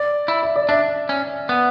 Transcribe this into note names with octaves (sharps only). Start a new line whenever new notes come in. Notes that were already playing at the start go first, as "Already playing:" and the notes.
Already playing: D5
E4
E5
D5
D4 E5
C#4
B3